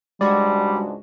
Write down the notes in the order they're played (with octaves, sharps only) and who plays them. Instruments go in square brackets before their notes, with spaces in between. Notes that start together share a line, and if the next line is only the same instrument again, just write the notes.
[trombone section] C#2 G#2 D4 [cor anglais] G3 [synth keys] G#3 F#4 [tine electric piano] D5